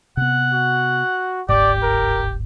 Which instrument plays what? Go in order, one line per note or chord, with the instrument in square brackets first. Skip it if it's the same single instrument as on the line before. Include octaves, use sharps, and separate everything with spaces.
[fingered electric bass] C3 B3 [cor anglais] F#5
[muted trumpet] F#4
[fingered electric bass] D1 G1 G#2 [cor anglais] G4 [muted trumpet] D5
[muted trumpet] A#4